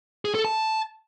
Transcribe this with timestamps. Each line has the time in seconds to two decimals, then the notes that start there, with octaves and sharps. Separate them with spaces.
0.25 G#4
0.35 A4
0.45 A5